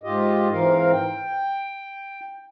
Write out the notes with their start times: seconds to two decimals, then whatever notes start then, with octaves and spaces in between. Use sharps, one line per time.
0.03 G#2 F4 G4 D#5
0.52 G#2 E3 C4 A#4 F5
0.92 G5